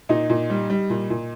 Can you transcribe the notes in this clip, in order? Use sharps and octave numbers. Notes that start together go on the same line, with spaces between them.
A#2 D#4
A#2
G3
G3
A#2
A#2